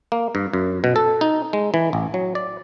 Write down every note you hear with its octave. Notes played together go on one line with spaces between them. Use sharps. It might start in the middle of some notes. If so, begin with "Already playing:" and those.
A#3
G2
F#2
B2
A4
D#4
G#3
E3
A1
F#3
D5